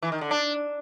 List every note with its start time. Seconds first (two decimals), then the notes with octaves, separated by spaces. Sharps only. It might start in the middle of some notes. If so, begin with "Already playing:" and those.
0.02 E3
0.12 D#3
0.21 D3
0.31 D4